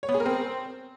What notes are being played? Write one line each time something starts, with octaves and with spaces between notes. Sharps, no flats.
C#5
B3
G#4
A#4
C4